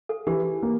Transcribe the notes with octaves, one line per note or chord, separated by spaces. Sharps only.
A4
E3 G4
A#3